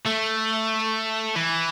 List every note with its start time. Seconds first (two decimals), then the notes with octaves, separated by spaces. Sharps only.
0.05 A3
1.36 E3